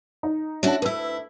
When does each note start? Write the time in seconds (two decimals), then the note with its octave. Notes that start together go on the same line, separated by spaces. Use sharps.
0.23 D#4
0.63 C#4 D4 E4 F#4 A5
0.82 D2 E4 B4 E6